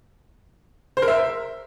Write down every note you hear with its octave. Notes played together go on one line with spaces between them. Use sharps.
C5
A#4
E5